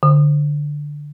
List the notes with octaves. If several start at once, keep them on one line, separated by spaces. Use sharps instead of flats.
D3